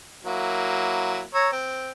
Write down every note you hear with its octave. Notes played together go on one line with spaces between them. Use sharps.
F#3 A#3 E4
C#5 A#5 E6
C4